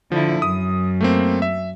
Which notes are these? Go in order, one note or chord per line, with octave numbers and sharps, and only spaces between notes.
D3 F3 E4
F#2 D#6
A3 A#3 C4
E5